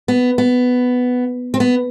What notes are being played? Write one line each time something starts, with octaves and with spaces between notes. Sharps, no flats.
B3
B3
C4
B3